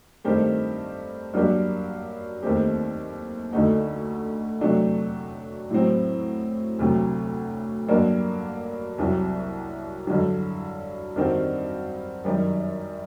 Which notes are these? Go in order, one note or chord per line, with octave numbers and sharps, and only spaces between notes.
G2 D#3 A3 C4 G4
G2 F#3 A#3 D4 G4
D#2 D#3 A3 C4 G4
D2 D3 A3 D#4 F#4
C3 F#3 A3 D4
A2 F#3 C4
D2 C3 F#3
G2 F#3 A#3 D4
C2 C3 F#3
G2 D3 F#3
G2 D#3 G3 C4 F#4
F#2 D#3 G3